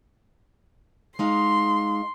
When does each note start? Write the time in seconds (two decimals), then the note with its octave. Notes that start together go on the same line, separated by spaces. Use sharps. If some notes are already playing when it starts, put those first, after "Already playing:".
1.19 G#3 D#4 F5 C6